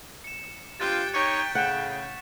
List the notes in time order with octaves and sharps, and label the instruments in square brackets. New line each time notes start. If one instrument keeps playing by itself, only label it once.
[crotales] C#7 E7
[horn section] G2 C3 F4 [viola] G4 G5 [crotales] F#6 A6
[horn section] D#4 C#5 [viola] G5 [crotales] C#6 B6 E7
[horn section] A2 C#3 [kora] F#5 [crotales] F#6 E7